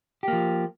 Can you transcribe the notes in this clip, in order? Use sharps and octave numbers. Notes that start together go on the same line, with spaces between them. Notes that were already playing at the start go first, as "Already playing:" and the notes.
F3 A#3 G4